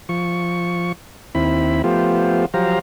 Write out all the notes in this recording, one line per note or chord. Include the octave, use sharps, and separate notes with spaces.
F3 C#6
D#2 C4 E4 B5
F3 A3 B3 F4 G4 C5
F3 F#3 G4 C5 F5 A#5